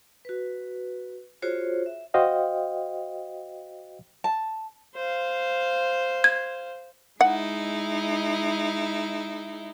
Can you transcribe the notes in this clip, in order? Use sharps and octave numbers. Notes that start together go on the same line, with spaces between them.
F#4 B4
F4 F#4 G#4 C5 C#5
E5
F#4 C5 D#5 F5 G5
A5
C5 F5
G#6
G#3 D#4 E4 F#5